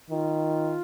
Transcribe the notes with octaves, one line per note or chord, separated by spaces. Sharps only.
D#3 F4